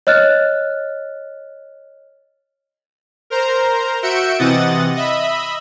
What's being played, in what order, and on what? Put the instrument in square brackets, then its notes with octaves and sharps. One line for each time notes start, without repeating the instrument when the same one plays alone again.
[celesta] C#5 D#5 F6 F#6 A6
[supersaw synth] A#4 C5 A#5
F#4 E5 G6 C#7 D7 E7
C3 E3 D#5 F#5 D#6 A6
D#5 E5 B5